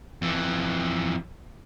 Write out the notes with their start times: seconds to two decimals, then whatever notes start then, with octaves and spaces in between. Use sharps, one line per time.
0.22 F2 E3